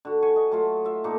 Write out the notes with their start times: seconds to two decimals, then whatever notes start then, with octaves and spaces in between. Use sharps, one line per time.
0.05 D3 F#4
0.22 G#5 C#6
0.36 D#5
0.51 F#3 A3 F4
0.85 F4 E5
1.04 A#2 A#3 D#4 A4